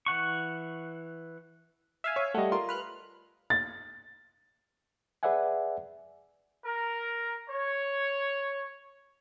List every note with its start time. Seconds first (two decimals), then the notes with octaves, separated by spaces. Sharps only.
0.06 E3 F#5 C#6
2.04 E5 F5 G#5
2.16 C#5
2.34 G3 A3 D#5 F#5
2.52 F4 A#4 C6
2.69 B4 F6 F#6
3.50 A6
5.23 G#4 B4 D5 E5 F#5 G#5
6.65 A#4
7.49 C#5